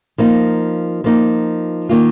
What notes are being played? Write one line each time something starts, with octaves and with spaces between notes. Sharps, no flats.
F3 A#3 D#4
F3 A#3 D#4
D#3 A#3 F4